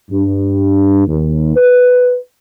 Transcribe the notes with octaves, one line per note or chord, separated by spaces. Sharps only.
G2
D#2
B4